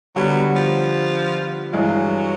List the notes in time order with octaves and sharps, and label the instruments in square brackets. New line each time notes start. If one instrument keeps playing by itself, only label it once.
[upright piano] D3 G3 B3 [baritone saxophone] F#3
[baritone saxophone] F3
[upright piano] G2 E3 G#3 [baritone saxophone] F#3